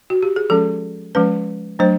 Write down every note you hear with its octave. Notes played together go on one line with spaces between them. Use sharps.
F#4
G4
G#4
F3 G#3 C#4 A4
F3 G#3 C#4 B4
F#3 A3 D4 C5